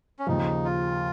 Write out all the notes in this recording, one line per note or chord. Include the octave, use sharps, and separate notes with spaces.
C#4
D#2 C#3 F3 D#4
F4